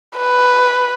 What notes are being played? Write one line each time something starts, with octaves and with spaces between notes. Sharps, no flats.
B4